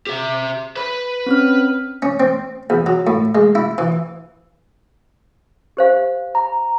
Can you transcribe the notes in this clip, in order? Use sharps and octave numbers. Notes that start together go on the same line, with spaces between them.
G4 E5
B4 B5
C4 C#4 F6
C#4
C4
E2
F#3
A2
G#3
E4
E3
G4 C5 F5
A#5